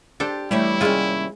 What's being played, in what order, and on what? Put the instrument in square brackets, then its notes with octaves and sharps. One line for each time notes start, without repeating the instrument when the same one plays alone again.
[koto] D4 A4 C5 [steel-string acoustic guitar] G4
[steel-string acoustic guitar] E3 A3 C#5 [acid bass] G3 [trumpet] E4
[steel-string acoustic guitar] D#2 C3 C#4 [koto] G#3 F4